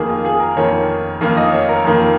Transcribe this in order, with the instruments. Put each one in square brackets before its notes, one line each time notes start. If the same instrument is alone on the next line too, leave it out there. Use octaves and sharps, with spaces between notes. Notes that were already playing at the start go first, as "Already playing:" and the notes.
Already playing: [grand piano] F2 D#3 A#3 G#4
F4
G#4
A#4
F2 D#3 A#3 C#5
F2 D#3 A#3 F4
D#5
C#5
A#4
F2 D#3 A#3